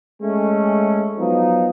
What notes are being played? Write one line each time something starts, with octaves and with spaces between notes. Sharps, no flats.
G#3 A3 C#4
F3 F#3 B3 D#4